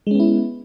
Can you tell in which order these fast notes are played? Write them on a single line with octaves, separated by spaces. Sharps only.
G#3 C#4 B3 E4